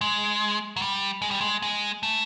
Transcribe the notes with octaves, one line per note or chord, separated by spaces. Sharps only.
G#3
F#3
G3
G#3
G3
G#3
G#3
A3